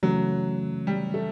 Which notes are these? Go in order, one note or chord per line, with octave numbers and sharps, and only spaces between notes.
C#3 E3 F#3 A3 C#4
G3
A3